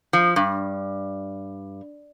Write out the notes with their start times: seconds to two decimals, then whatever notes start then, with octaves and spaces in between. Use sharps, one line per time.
0.13 F3
0.36 G2